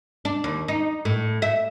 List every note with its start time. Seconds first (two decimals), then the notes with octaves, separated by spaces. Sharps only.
0.25 D4
0.44 D#2
0.68 D#4
1.05 A2
1.42 E5